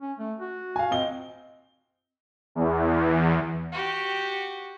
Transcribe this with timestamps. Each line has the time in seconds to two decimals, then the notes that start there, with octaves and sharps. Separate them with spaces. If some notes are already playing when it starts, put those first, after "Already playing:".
0.02 C#4
0.19 A3
0.40 F#4
0.76 F5 G#5
0.91 C4 D#5 G7
2.55 E2
3.72 F#4 G4